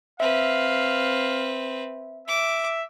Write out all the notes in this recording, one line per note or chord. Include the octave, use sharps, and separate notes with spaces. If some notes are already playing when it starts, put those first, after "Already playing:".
C4 B4 E5 F5
E5 D6